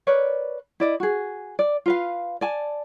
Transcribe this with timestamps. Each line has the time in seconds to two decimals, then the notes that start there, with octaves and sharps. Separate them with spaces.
0.07 A#4 B4 C#5 D5
0.80 E4 D5 D#5
1.00 F#4 G#4
1.59 D5
1.86 F4 B4 F5
2.41 D5 G#5 A5